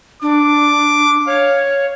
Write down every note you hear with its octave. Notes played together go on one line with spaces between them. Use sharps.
D4 D6
C#5 F5
F5